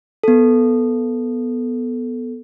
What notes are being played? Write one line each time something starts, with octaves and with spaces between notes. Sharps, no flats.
B3 A4